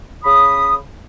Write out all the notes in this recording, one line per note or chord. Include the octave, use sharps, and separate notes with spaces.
C#3 B5 D#6